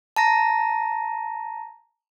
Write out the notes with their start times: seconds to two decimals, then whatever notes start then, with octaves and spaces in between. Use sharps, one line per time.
0.16 A5 A#5 A#6